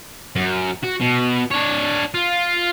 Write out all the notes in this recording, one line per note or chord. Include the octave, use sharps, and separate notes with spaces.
F#2
F#4
B2
D4 C#5
F4